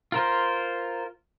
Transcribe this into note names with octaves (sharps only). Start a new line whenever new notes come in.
F4 A#4 C5